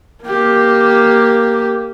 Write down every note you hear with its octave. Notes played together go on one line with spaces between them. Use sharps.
A#3 G4